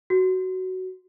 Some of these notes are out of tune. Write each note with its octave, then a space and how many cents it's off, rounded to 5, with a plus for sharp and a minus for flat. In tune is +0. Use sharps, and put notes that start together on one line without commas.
F#4 +10